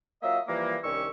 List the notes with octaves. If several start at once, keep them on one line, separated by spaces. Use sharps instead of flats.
F#3 A#3 F4 D#5 E5
E3 F3 G3 A#3
C2 D#3 G3 C#4 C#6 E6